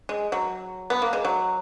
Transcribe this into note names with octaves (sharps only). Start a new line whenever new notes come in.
G#3
F#3
B3
A#3
G#3
F#3